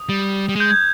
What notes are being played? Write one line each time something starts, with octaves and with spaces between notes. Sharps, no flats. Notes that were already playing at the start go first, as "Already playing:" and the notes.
Already playing: D#6
G3
G3
G#3 G6
G#6